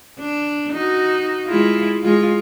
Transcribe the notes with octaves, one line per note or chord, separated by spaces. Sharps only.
D4
D#4 F#4
G#3 E4 F4
G#3 F4